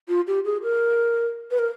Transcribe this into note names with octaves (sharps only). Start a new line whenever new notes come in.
F4
G4
G#4
A#4
B4
A#4